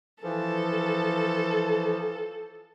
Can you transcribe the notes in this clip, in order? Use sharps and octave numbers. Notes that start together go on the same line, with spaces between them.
E3 F3 A4